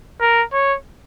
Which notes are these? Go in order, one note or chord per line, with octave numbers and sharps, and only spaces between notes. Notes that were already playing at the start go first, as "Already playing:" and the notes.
A#4
C#5